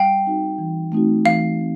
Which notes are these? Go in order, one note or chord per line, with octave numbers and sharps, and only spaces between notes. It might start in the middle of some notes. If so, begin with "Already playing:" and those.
Already playing: G3 F5 G5
C4 D#4 F#4
E3
A3 C4 D#4 F#4
E3 F5
A3 C4